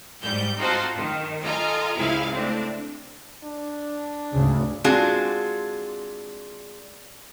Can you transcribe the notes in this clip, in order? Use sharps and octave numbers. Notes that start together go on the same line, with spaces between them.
G#2 G3 G6
C4 D#4 F4 F#4 A4 C5
D#3
F4 A4 D#5 G#5 A#5
C#2 C3 E4 G#4 F5
A2 C4 D4
D4
D2 G#2 C#3
G#3 C4 D4 F4 F#4 G#4